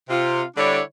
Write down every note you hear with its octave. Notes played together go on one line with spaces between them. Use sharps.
C3 F4
D3 G3 D4 E4 C#5 D5